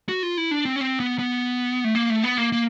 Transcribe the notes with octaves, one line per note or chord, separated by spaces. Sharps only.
F#4
F4
E4
D4
C4
C#4
C4
B3
B3
A3
A#3
A3
B3
A#3
A#3